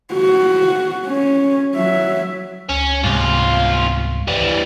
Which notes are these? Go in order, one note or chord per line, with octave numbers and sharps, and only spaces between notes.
F#4
C#4
F#3 E5
C#2 C#4
B1 G#2 C3 G3 F4
E2 E3 G3